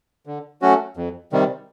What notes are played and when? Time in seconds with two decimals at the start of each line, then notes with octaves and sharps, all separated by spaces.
0.26 D3
0.62 F#3 A3 C#4 F#4
0.97 F2
1.32 C3 D#3 G3